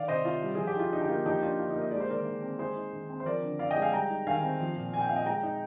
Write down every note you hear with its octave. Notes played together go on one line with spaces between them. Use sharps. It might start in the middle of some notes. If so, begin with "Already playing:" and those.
Already playing: D#3 D5 F5
C3 C5 D#5
C3 F4
G3
F3 G#4
G4
D#4 F4
D3 D#4
G4
A#3 F4
F3 D#4 G4
D4 F4
D3 F4
D#4
A#3
D#5
G#3 D5
C5
D#3 A#4 D5
D#3
C4
G#3 G#4 C5
D#4
D#3
C4
C5
F3 A#4 D5
D3
D3 D5 F5
D#5 G5
G#3
F5 G#5
G3 G5 A#5
D#4
D#3 F5 G#5
C4
F3
A#2
A#2 G#5
G5
C4 F5
D#5 G5
G#3 G5 A#5
D#4